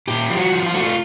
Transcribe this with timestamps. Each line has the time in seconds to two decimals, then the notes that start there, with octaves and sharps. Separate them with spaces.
0.08 A#2 G4
0.30 F3
0.37 F#4
0.52 F3
0.66 F4
0.74 A3 F#4
0.82 F4